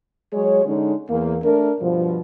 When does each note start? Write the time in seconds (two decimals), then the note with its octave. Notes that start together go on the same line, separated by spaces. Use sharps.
0.33 F#3 G#3 G#4 C#5
0.66 D3 G#3 C#4 D#4
1.09 E2 A#3
1.43 A3 D4 A#4
1.81 G2 B2 F3